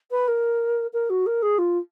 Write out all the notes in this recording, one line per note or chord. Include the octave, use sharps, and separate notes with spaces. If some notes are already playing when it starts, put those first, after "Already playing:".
B4
A#4
A#4
F#4
A#4
G#4
F4